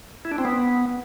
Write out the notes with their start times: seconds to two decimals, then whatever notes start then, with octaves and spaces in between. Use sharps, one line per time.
0.25 E4
0.32 D4
0.38 C4
0.45 B3